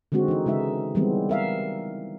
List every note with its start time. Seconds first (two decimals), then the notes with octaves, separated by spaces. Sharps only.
0.12 D3 D#3 G#3 C4 F#4
0.28 E3 D#4
0.46 C#3 G#3 D#4 E5
0.95 D#3 E3 G3 G#3 B3 C4
1.29 A#4 E5 F5